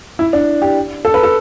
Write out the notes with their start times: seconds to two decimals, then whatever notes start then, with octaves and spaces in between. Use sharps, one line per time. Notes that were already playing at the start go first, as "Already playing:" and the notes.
0.19 E4
0.33 D4
0.62 G4
1.05 A4
1.14 B4
1.23 A4